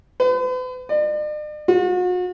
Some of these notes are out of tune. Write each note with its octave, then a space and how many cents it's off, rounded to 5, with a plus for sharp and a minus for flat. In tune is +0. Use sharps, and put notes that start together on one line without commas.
B4 +45
D5 +45
F#4 -40